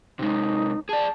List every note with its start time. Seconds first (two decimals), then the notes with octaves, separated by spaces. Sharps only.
0.19 C3 G#3 D#4
0.89 G#4 D5 A5